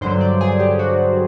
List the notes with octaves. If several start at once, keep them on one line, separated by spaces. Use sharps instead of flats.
G2 D3 F#3 C5
D5
G#4
G4
F#4